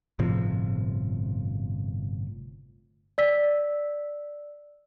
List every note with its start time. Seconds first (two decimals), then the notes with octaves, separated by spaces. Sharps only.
0.19 G1 A2 C3 F3
3.18 D5 E6 B6